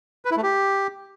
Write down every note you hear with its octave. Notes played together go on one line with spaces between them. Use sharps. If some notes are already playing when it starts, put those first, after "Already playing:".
B4
E4
A3
G4